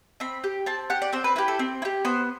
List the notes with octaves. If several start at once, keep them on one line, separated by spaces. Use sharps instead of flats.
C4 B5
G4
C4 A5
G4 F#5
D5
C4 C5
B4
E4 G4 B4
A4
C4
E4
G4
B3 C5